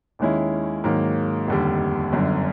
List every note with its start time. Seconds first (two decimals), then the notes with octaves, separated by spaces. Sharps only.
0.19 D#2 D#3 G#3 C#4 E4
0.84 G#2 D#3 F#3 A#3
1.47 F1 D#2 D3 G3
2.12 G1 F#2 D3